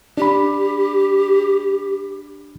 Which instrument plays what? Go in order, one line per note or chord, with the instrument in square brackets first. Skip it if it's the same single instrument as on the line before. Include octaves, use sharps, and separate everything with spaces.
[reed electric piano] D4 B5 [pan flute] G4